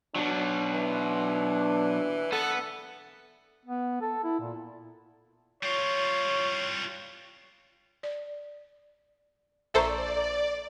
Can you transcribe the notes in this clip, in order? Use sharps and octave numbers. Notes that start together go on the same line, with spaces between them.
B2 F#3 D4
E3
B3 A4
B3
A4
E4
A#2
G3 F4 C#5
D5
A#1 A4 C5 D5 E5 A#5 C#6